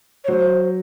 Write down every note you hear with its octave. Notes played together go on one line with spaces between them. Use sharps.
C#5
F#3 C5